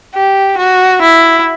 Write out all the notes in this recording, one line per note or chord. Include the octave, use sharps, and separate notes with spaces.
G4
F#4
E4